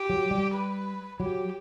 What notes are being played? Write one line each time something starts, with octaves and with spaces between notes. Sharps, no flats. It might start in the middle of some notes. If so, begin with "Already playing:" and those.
Already playing: G4
F#3
G3
B4
F#3 G4